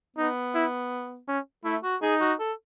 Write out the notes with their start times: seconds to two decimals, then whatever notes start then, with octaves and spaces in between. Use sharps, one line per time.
0.17 B3 D#4
0.54 E4
1.28 C#4
1.64 A3 E4
1.83 F#4
2.02 D#4 G#4
2.20 F#4
2.39 A4